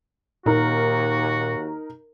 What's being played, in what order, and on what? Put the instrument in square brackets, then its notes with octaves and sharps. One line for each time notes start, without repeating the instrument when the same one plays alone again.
[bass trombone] D#2 [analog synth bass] A#2 [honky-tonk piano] D#4 A#4 [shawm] F#4